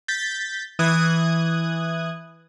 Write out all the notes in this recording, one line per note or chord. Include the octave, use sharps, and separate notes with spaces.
G6 A6 B6
E3 D#6 F#6 G#6